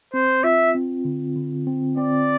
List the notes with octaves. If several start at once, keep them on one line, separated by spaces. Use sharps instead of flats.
C4 C5
F4 E5
C4
D3
D3
C4
C4 D5